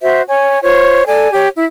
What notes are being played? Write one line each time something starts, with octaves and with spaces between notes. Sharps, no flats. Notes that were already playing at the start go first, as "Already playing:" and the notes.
F#4 C5 E5
C#5 G#5
F4 C5 C#5
A4 D5 G#5
G4 C#5
E4